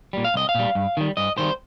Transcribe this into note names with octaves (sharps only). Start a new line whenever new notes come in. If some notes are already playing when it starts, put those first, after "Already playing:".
A#2 G3
F5
C2 D#5
F5
A#2 G3
G2
D#3 G3
G2 D#5
D#3 G3 C5